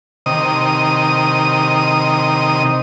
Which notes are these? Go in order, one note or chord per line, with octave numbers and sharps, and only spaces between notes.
C3 D#3 D#6